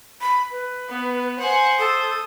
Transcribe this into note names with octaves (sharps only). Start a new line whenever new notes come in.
B5
B4
B3
C5 F#5 G#5
A4 D#6